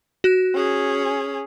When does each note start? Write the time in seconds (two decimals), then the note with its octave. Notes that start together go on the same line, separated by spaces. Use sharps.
0.24 F#4 F#6
0.54 C#4 G#4